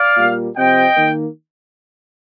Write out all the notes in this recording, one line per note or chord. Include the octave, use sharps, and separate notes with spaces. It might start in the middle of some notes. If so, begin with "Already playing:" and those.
Already playing: D5 F5
A#2 G3 A#3
C3 F3 C4 D#5 G5
D#3 A#3